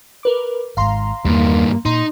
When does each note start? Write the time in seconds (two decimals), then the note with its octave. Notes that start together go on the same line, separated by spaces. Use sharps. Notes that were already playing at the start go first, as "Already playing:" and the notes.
0.23 A#4 B4 D6
0.77 G#1 G#2 F5 A#5 C6
1.25 E2 G2 D#3 G3 A#3
1.85 A#2 D#4 C6